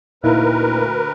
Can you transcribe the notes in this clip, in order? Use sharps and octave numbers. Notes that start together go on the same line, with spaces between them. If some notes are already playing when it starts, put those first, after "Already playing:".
D2 A#2 D#4 E4 A#4 B4